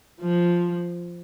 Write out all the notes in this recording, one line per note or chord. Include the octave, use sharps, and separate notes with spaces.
F3